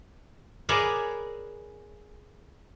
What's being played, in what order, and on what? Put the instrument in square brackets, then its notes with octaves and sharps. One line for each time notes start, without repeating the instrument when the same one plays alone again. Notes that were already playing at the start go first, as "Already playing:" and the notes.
[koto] G#4 A#4 B4 C#5 D5 E5